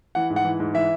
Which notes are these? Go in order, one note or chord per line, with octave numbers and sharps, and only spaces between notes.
E3 F#5
G#2
F#5
E3
G#2
E3 E5